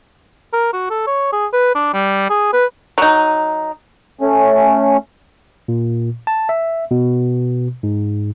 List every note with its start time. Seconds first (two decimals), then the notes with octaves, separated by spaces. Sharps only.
0.53 A#4
0.73 F#4
0.90 A4
1.07 C#5
1.32 G#4
1.53 B4
1.75 D4
1.93 G3
2.30 G#4
2.53 B4
2.98 F#3 D#4
4.21 A3 C#4
5.68 A#2
6.27 A5
6.49 E5
6.91 B2
7.83 G#2